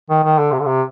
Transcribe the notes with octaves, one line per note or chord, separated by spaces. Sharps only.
D#3
D#3
D3
C3
D3
C3